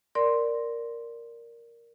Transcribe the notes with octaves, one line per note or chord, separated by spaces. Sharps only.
A#4 D5 C6